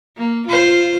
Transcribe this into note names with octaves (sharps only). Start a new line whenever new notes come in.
A#3
F4 C5